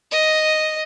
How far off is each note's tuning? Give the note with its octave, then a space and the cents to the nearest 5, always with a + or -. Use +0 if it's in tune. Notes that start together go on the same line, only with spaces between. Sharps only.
D#5 +0